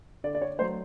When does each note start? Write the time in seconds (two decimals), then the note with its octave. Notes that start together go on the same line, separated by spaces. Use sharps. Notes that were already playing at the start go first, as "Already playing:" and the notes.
0.24 D3 D5
0.35 D5
0.42 C#5
0.58 F#3 A3 C5